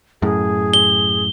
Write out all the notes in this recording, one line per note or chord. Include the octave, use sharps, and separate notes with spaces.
F#2 A2 G#4
G7